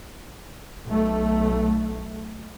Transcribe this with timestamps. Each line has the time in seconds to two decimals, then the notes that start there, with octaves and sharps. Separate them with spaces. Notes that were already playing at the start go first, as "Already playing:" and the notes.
0.86 B1 A3